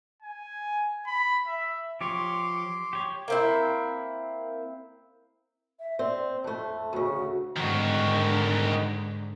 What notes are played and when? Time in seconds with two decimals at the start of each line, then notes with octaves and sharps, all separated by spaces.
0.23 G#5
1.07 B5
1.48 E5
2.01 F3 G4 C#5 C6 D6
2.93 G4 C#5
3.28 A#3 C4 E4
5.79 E5
5.99 C4 D5
6.44 F2 A3 A5
6.93 D2 C#3 F#4
7.57 G#2 D3 D#3 F#4